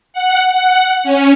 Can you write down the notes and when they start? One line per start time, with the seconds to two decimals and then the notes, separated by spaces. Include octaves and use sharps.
0.13 F#5
0.52 F#5
1.04 C#4